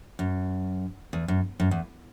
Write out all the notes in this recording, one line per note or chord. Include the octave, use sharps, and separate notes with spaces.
F#2
E2
F#2
F#2
E2